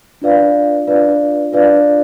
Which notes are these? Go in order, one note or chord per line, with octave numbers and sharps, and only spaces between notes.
D4 F4 B4 D5 F5
D4 F4 B4 D5 F5
D4 F4 B4 D5 F5